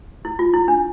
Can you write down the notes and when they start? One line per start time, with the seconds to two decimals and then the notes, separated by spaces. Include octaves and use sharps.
0.25 E4
0.39 F4
0.54 E4
0.68 D4